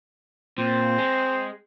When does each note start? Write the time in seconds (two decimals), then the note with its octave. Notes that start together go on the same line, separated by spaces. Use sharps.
0.58 A#2 C4
0.98 G#3